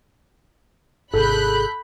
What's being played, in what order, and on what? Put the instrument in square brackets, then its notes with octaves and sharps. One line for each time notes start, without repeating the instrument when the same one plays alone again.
[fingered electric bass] G#1 C3 [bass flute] G#4 [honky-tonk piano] A4 [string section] B5 F#6 G6